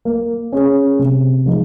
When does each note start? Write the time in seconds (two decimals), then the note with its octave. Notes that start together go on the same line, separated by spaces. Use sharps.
0.05 A#3
0.52 C#4 G#4
0.99 C3
1.46 F3 G#3 D#4